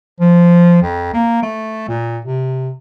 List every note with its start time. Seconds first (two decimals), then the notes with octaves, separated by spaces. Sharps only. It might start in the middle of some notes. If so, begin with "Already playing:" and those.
0.20 F3
0.82 F2
1.13 A#3
1.42 A3
1.88 A#2
2.25 C3